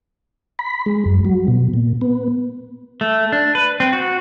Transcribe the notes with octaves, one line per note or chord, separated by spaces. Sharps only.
B5
G#3
F#2
F#3
B2
A#2
B3
A3
D4
B4
C4
F#4